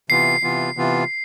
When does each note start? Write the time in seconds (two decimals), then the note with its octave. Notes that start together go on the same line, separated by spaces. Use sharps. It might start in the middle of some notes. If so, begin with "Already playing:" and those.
0.10 C3 E3 B3 F4 C7
0.43 C3 E3 B3 F4
0.77 C3 E3 B3 F4